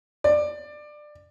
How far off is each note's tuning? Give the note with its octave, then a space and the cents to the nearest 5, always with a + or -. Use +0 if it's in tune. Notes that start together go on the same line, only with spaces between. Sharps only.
D5 +20